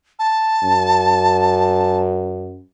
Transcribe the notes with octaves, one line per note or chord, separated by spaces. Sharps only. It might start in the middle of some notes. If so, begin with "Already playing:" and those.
A5
F#2